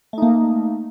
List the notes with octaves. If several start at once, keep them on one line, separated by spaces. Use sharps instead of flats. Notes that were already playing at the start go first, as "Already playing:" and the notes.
A3 A#3 D#4